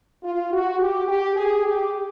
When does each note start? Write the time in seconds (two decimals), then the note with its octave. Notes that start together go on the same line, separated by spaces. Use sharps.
0.23 F4
0.52 F#4
0.79 G4
1.08 G4
1.36 G#4
1.64 G4